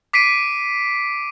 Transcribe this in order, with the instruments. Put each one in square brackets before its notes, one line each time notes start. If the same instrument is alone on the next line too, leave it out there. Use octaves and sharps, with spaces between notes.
[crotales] D6 B6 C7 D7 D#7